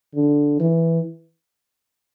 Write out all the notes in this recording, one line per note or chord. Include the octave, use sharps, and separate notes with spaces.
D3
E3